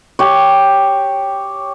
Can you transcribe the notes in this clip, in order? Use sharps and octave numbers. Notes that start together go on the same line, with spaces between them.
G4 C#5